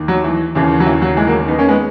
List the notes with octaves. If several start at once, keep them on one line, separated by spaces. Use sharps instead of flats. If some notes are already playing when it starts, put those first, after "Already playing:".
Already playing: D#2 D#3
F#3
E3
D#2 C#3 E3
F#3
E3
F#3
E3 G#3
F#3 A#3
B3 D#4
A#3 C#4
G#3 B3